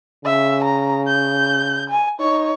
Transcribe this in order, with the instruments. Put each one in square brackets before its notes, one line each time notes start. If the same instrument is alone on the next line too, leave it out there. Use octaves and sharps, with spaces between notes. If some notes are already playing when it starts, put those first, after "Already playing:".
[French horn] C#3 [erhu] E5
[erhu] A#5
G6
G#5
[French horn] D#4 [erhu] C#5